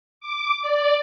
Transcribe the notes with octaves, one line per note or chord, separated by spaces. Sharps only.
D6
D5